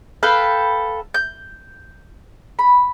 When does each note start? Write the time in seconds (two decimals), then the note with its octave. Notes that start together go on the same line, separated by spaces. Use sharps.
0.23 A4 B4 F5 G5
1.14 G6
2.59 B5